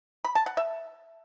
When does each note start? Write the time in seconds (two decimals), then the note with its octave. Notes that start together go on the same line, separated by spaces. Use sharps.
0.24 B5
0.35 A5
0.46 F#5
0.57 E5